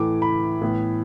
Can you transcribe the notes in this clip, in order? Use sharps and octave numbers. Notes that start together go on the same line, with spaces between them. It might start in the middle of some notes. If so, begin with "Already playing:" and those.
Already playing: A2 E3 A3 D6
B5
A2 E3 B3